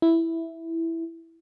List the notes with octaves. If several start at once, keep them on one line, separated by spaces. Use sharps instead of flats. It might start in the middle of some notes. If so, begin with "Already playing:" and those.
E4